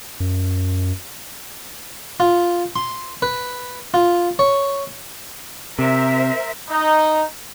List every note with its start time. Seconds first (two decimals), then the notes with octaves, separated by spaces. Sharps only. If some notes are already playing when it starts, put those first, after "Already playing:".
0.20 F#2
2.20 F4
2.76 C6
3.22 B4
3.94 F4
4.39 C#5
5.79 C3 A#4 C5 E5
6.70 D#4